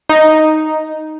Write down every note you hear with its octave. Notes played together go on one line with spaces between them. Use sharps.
D#4